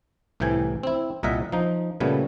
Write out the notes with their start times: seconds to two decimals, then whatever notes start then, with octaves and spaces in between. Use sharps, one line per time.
0.40 C2 A2 C3 E3 G5 G#5
0.83 C4 E4
1.23 C2 A#2 A#4 D#5 E5 F#5
1.52 F3 D#4
2.00 A#2 C#3 G3 A3 B3